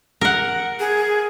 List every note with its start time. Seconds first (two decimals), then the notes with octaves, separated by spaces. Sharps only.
0.21 A#4 F#5
0.80 G#4